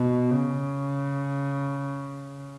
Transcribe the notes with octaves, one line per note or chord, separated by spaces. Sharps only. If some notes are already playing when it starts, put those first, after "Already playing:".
Already playing: B2
C#3